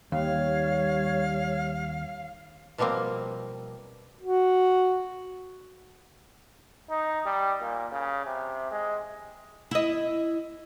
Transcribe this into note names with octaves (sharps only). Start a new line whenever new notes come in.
D#2 G3 C#5 F5
B2 F3 G3 A#3 C4
F#4
D#4
G3
A#2
C#3
C3
G#3
E4 D#5